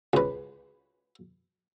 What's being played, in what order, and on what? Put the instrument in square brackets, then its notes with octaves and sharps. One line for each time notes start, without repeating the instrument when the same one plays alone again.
[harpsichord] C#2 B4